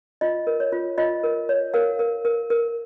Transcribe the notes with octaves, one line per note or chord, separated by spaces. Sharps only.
F4 D#5
A#4
C#5
F4
F4 D#5
A#4
C#5
A#4 F5
A#4
A#4
A#4